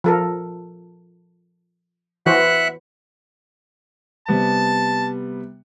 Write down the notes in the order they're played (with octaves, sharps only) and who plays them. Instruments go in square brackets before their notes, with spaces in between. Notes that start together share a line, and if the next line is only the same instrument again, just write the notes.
[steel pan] F3 A4 A#4
[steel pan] E3 F#4 C5 [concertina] E5 F#5 F#6
[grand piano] C3 G3 B3 [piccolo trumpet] A5